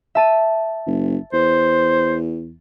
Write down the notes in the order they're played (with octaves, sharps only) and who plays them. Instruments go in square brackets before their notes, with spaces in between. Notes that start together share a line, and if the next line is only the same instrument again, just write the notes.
[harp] E5 A5 D#7
[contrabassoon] F#1
[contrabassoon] E2 [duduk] C5